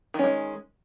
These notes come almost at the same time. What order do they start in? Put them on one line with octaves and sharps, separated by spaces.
D#3 C#4 G#3